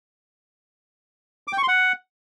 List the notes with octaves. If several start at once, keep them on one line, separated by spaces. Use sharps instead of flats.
D6
G5
C#6
C6
F#5